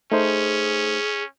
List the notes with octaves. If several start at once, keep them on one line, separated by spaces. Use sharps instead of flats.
A3 C#4 D#4 G#4 C5